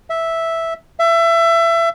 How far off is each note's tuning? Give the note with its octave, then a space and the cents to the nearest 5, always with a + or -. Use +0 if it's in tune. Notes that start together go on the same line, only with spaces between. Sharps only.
E5 -5
E5 +25